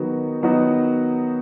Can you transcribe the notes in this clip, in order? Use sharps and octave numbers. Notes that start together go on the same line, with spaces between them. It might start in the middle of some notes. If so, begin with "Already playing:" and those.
Already playing: D#3 F#3 B3 D#4 F#4
D#3 F#3 B3 D#4 F#4